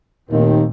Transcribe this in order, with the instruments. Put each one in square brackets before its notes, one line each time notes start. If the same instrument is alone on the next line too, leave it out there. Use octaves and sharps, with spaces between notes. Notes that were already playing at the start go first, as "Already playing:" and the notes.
[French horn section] D#2 D#3 [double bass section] A#2 A3 C4